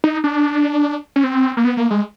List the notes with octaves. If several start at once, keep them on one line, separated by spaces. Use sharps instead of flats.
D#4
D4
C#4
C4
A#3
B3
A#3
G#3